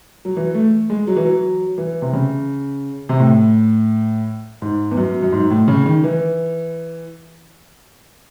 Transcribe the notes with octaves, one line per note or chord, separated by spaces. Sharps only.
F#3
E3
A3
G#3
F#3
E3
F#3
E3
C3
C#3
C3
A2
G#2
E2
F#2
F#2
G#2
A2
C#3
D#3
E3